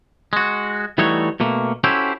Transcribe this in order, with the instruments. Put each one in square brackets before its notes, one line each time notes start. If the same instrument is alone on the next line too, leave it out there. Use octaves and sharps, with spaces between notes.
[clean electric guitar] G#3 F#4
E3 G3 A3 D#4 F#4 C#5
B2 A3 A#3
C#4 E4 F#4 G4 A4 C5